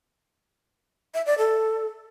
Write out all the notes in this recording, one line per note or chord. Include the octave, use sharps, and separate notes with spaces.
E5
D5
A4